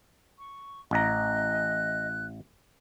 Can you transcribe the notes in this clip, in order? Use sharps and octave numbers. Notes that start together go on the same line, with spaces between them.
C#6
A1 D#5 A#5 F#6